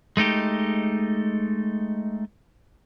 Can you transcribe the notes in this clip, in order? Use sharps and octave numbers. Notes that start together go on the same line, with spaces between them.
G#3 A3 D#4 G4